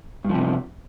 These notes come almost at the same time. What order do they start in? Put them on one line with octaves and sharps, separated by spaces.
G2 F3 C3